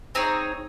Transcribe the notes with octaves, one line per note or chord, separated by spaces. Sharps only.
C4 D#4 G#4 C#5